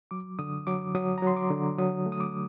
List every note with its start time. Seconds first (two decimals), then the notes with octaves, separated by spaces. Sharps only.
0.11 F#3 D6
0.39 D3 D#6
0.67 F#3 D6
0.95 F#3 D#6
1.18 A#5
1.22 F#3 C6
1.36 D6
1.50 D3
1.78 F#3 D#6
2.06 A3
2.12 D#6
2.20 D6